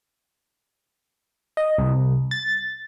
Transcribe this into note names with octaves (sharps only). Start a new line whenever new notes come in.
D#5
C2
A6